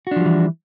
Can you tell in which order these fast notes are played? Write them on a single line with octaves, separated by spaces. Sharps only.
F#4 D4 F3 G3 E3